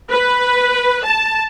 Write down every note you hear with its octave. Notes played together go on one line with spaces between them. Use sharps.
B4
A5